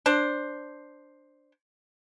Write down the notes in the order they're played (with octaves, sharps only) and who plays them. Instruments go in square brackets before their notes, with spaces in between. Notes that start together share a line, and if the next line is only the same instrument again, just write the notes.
[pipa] D4 C5